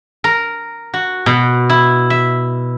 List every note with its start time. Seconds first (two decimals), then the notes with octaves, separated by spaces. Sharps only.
0.24 A#4
0.94 F#4
1.26 B2
1.70 E4
2.10 E5